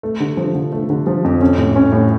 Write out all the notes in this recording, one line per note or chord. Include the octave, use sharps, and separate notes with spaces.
A3
D3
F3
D3
A3
D3
F3
F2
C#4
A2
C#4
A2